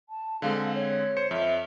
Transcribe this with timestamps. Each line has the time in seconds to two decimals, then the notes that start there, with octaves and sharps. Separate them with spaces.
0.09 A5
0.42 D3 G#3 C4 F5
0.75 C#5
1.17 C5 C#7
1.31 F2 E5